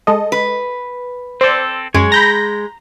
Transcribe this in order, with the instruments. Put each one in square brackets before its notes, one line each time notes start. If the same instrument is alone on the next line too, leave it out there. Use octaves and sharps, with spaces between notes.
[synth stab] G#3 A4 D#5
[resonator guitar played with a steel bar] B4
[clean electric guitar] C4 A4 [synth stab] C5 D5
[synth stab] F#2 [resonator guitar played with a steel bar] G#3 [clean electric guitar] C#5
[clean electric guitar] A#5 [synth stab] B5 G6 A#6